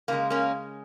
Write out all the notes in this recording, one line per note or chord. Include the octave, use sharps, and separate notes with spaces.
C#3 F3 G#3 A#3
A#3 C#4